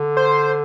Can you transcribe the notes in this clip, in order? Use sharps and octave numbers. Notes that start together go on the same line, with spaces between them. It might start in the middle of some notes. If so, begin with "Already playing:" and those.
Already playing: D3
C5